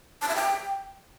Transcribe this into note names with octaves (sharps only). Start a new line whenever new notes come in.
A5
E5
G5